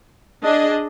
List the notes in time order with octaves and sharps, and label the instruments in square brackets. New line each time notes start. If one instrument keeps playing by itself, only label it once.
[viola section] D4 G#4 D#5